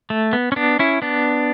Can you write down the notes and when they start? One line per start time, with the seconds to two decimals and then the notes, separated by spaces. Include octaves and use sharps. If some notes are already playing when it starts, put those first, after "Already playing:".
0.10 A3
0.33 B3
0.52 C#4
0.56 B3 D4
0.79 C#4 E4
1.02 B3 D4